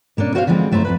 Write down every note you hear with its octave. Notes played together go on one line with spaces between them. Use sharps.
B2 A#3 C#4 D4
F#4 C5 C#5 E5 F5
D3 E3 F3 G#3 C4
F#2 A3 E4 C5 A#5
F2 E3 B4